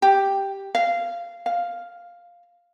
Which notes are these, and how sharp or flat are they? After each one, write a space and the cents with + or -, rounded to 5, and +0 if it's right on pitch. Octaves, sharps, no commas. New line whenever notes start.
G4 +0
F5 -15
F5 +0